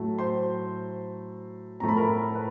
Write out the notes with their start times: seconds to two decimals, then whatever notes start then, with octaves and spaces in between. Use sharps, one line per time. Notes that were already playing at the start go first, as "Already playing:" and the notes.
Already playing: A2 F#3 A3
0.19 C5 C6
1.80 A2 F3 A3 A#5
1.88 B5
1.97 A#4 A#5
2.35 B4